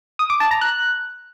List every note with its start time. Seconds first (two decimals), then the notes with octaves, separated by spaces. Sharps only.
0.19 D#6
0.30 D6
0.40 A5
0.51 A#5
0.61 F#6